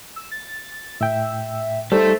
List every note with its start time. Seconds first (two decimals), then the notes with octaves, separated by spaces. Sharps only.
0.16 E6
0.31 A6
1.01 A2 E5 G5
1.92 G3 A3 D#4 A4 C5